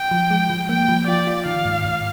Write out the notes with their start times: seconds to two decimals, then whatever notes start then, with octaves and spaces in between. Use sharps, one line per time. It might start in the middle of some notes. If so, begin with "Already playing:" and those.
Already playing: G5
0.11 F3
0.30 G#3
0.50 F3
0.69 A#3 G5
0.88 F3
1.07 F4 D5
1.27 F4
1.46 D#3 F5
1.65 G#2
1.85 G#2